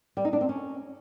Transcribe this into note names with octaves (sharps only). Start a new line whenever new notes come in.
G3
D#4
D4
C4
C#4